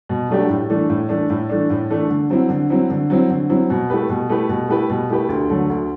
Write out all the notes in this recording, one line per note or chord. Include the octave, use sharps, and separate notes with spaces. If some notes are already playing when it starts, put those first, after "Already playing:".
B2
F#3 A3 D4 G4
A2
E3 A3 D4
A2
E3 A3 D4
A2
E3 A3 D4
A2
E3 A3 D4
D3
F#3 C4 E4
D3
F#3 C4 E4
D3
F#3 C4 E4
D3
F#3 C4 E4
B2
A3 E4 G4 B4
B2
A3 E4 G4 B4
B2
A3 E4 G4 B4
B2
A3 E4 G4 B4
D2
D3 F#3 A3
D2